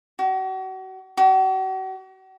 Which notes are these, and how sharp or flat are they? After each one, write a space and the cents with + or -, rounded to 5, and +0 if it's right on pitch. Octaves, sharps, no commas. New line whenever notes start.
F#4 +35
F#4 +40